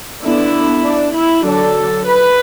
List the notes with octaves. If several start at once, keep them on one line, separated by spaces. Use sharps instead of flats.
D3 B3 D4 E4
D4
E4
D3 F#3 D4 A4
B4